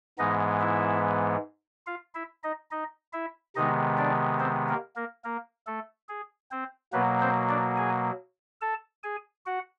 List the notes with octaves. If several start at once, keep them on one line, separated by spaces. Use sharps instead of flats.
G#2 E3 G#3 B3 D#4 D#5
E4 E5
F4 F5
E4 E5
D#4 D#5
D#4 D#5
E4 E5
C3 D#3 G#3 B3 D#4 D#5
D4 D5
C4 C5
A#3 A#4
A#3 A#4
A#3 A#4
A3 A4
G#4
C4 C5
B2 F#3 A#3 B3 B4
C4 C5
D4 D5
G#4 G#5
A4 A5
G#4 G#5
F#4 F#5